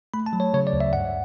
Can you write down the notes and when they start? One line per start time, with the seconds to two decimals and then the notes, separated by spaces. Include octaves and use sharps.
0.14 A3 B5
0.26 A5
0.33 F#3
0.40 C#5
0.54 C#3 C#5
0.67 D5
0.73 D2
0.80 E5
0.93 G2 F#5